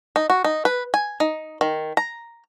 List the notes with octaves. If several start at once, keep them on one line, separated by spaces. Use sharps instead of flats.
D#4
F#4
D#4
B4
G#5
D#4
D#3
A#5